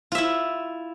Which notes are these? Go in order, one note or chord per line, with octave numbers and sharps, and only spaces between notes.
E4 F4 E5